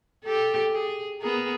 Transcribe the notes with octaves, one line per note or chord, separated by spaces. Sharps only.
G4 A4
G#4
B3 G#4 A#4